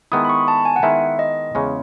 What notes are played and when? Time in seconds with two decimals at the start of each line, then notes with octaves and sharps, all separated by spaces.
0.12 D#3 G#3 B3 E4 D#6
0.24 B5
0.29 C#6
0.48 A5
0.65 G#5
0.76 F#5
0.83 D#3 G#3 B3 E4 E5
1.19 D#5
1.55 E2 C#3 G#3 C#4